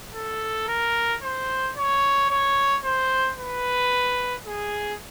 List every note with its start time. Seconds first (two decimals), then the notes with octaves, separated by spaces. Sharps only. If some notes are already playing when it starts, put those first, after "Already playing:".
0.15 A4
0.68 A#4
1.23 C5
1.77 C#5
2.30 C#5
2.84 C5
3.38 B4
4.46 G#4